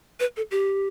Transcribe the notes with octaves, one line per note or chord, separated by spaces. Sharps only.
B4
A4
G4